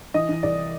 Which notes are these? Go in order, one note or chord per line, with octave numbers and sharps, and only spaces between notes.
E3 D#5
E3
C2 D5